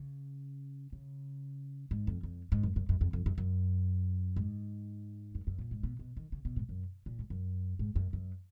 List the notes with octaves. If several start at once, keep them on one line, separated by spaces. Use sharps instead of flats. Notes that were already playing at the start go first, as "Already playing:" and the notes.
Already playing: C#3
C#3
G#2
F2
F2
G#2
F#2
F#2
F#2
F2
F2
F#2
F#2
G#2
F#2
F#2
A#2
G#2
B2
B2
D#3
C#3
B2
G#2
F#2
A#2
G#2
F#2
G#2
F#2
F#2